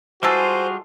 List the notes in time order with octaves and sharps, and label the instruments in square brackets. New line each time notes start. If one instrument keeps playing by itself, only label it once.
[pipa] E3 G#3 A4 [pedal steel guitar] G3 F4 G#4 [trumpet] F#4 [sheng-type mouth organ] C5